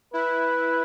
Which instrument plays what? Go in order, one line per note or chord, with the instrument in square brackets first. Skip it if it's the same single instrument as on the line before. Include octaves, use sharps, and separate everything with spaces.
[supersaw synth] E4 [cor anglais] B4